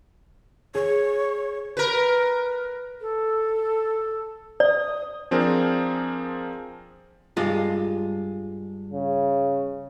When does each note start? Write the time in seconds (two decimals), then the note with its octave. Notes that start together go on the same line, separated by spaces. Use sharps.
0.75 G#4 C#5
1.77 A#4 B4
3.01 A4
4.60 D5 D#6
5.31 F3 C4 D4 G#4 A#4
7.37 G2 G#3 F4
8.92 C#3